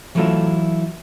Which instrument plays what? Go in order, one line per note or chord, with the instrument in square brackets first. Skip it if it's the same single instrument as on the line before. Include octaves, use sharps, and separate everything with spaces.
[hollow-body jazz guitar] E3 F#3 A3 E4 F4 A4